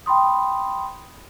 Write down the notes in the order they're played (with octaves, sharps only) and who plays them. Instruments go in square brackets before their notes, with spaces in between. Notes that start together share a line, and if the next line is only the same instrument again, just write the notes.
[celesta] G5 B5 C6 D#6